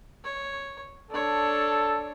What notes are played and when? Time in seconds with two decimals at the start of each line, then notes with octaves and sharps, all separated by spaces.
0.25 C#5
1.11 D4 A4 C#5